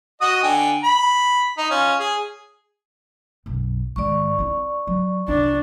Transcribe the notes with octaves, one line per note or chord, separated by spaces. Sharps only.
F#4 D#5 D#6
D3 G5 G#5
B5
D#4
C#4 F4
G#4
B1 F#2
G#2 D#3 D5 C#6
C4 E4
F#3
C2 D4 F4